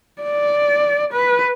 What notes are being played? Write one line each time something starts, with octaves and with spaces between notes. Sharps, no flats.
D5
B4